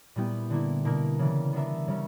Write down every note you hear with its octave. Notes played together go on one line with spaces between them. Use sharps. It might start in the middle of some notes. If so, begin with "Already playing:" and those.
A#2 G3 B3 E4 G4
D3 A#3 E4
B2 A#3 E4 A#4
C#3 E3 G3
B3 D4 A#4 E5
C#3 G3 C#4